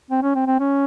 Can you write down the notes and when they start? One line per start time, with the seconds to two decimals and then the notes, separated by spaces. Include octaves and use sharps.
0.11 C4
0.23 C#4
0.35 C4
0.47 C4
0.59 C#4